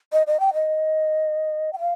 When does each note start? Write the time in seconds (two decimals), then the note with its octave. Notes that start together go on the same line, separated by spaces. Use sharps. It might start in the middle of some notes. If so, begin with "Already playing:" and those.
0.12 D#5
0.27 D#5
0.40 G5
0.54 D#5
1.73 G5
1.79 F5